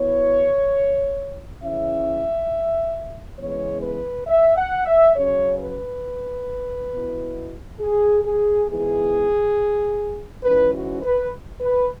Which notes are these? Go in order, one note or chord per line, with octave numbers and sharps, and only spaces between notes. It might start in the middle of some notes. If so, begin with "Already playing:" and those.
Already playing: B2 B3 E4 C#5
C#3 E3 C#4 E4 E5
E2 C#3 E3 G#3 B3 C#5
B4
E5
F#5
E5
C#3 F#3 C#4 C#5
B4
B2 B3 E4
G#4
G#4
G#2 E3 B3 E4 G#4
G#2 E3 C#4 E4 B4
F#4
B4
B4